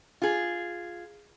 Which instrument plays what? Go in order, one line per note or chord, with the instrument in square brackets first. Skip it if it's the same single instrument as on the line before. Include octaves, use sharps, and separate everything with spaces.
[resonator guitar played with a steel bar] F4 G#4